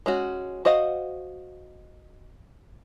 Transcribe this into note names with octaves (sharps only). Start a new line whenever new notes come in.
G#3 C#4 F#4
F#4 C5 D#5 F5 F#5